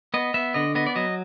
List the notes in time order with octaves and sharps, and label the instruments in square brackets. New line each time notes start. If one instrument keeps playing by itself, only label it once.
[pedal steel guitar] B3 D#5
B3 E5
D3 D#5
B3 D#5
D5
F#3 D#5